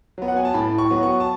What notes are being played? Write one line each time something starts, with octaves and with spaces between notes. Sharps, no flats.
F#3 B3
F#5
G#5
A5
A2 B5
C#6
F#3 B3
C#6
A5